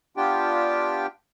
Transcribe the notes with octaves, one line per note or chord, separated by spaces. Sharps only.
B3 D4 F4 G4 G5